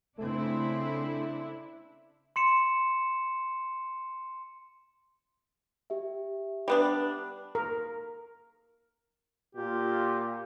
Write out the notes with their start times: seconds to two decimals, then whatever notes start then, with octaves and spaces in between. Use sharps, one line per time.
0.18 C#3 A3 C4 D4 E4
2.36 C6 C#7 E7
5.90 G4 E5
6.68 G3 B3 D4
7.55 A#4
9.55 A#2 F4 G4